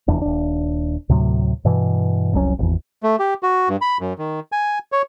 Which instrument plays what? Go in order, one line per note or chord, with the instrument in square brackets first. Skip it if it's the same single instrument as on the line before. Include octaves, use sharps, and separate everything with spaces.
[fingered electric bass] F1 E2 D4
D#1 D4
D2 A2 C3 F#3
G2 B2 E3
F1 C2 F#3 C#4
D#1 G#1 E2
[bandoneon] A3
G4
F#4
G2
B5
F#2
D#3
G#5
C#5